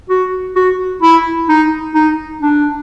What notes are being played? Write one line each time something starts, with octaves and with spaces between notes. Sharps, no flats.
F#4
F#4
E4
D#4
D#4
D4